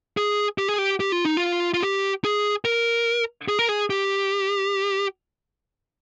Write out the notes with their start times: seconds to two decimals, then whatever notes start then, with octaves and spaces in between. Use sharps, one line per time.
0.17 G#4
0.58 G4
0.68 G#4
0.78 G4
1.00 G4
1.12 F4
1.25 D#4
1.37 F4
1.74 F4
1.83 G4
2.24 G#4
2.65 A#4
3.48 G#4
3.59 A#4
3.69 G#4
3.90 G4